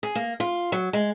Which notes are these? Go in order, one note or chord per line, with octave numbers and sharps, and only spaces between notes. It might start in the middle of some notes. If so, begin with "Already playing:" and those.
G#4
A#3
F4
F#3
G#3